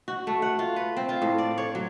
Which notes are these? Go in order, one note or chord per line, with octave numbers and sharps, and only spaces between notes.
F#4
A3
F#5
F4
B4
C4
F4
A2
D5
C#5
F#3